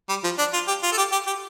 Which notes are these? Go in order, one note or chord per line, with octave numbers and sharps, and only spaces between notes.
G3
F3
D4
F4
G4
F4
A4
G4
G4
G4